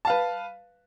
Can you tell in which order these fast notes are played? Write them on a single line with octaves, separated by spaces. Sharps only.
A5 F5 B4